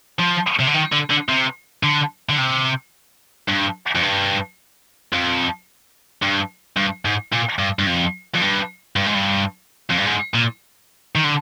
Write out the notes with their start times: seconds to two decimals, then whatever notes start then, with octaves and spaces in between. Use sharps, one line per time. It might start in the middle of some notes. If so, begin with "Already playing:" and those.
0.19 F3
0.59 C3
0.67 D3
0.74 D#3
0.92 D3
1.10 D3
1.29 C3
1.83 D3
2.29 D3
2.38 C3
3.48 G2
3.95 F2
4.03 G2
5.13 F2
6.22 G2
6.77 G2
7.05 G#2
7.32 A#2
7.59 G2
7.79 G2
7.87 F2
8.34 F2
8.41 G2
8.96 G2
9.06 G#2
9.15 G2
9.90 F2
9.97 G2
10.06 G#2
10.34 A#2
11.16 D#3
11.24 D3